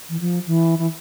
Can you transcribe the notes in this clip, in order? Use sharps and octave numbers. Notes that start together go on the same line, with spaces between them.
E3
F3
E3
E3